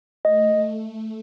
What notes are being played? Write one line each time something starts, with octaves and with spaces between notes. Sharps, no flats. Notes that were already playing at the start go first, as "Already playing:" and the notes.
A3 D#5